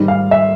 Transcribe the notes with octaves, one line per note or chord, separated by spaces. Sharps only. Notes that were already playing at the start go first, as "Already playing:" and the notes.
Already playing: G#2 D#3 G3
F5
E5